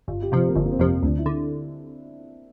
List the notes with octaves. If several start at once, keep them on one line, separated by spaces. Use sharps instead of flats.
G1 F4
G4
F2 C3 F3 F4
A#3
G1 C4
A#3
C4
F2 C3 F3
C4
D2 D4
E4
D3